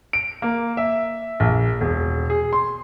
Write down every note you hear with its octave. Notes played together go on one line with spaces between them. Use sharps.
D7
A#3
E5
A#1
E1
G#4
C6